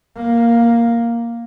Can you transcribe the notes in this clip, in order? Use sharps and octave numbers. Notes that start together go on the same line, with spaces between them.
A#3